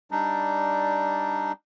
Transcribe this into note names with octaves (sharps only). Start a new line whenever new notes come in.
G3 D4 D#4